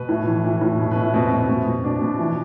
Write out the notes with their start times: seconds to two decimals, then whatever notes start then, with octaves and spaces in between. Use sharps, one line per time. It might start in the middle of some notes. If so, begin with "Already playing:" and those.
Already playing: B2 B4
0.09 A2
0.27 E3
0.44 E3
0.61 A2
0.79 B2
0.91 B4
0.96 B2
1.02 E4
1.14 B2 C4
1.31 B2
1.49 B2
1.66 B2
1.84 B2 D4
2.02 B2
2.19 E3